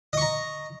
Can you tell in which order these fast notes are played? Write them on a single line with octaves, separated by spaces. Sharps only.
D#5 C#6 A#5